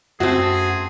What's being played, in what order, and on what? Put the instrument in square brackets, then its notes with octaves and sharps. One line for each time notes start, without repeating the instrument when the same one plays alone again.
[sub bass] F#2 [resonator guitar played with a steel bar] A3 C4 [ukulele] F#4 [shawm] G#4